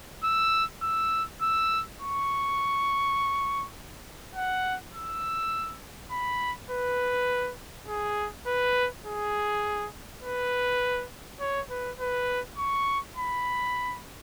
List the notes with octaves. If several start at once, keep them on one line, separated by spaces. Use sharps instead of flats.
E6
E6
E6
C#6
F#5
E6
B5
B4
G#4
B4
G#4
B4
C#5
B4
B4
C#6
B5